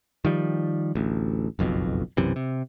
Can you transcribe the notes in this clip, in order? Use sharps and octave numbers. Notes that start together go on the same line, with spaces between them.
D#3 F3 G3
A1 D2
F#1 B1 F2 B2
B1 F#2 C3 E3
C3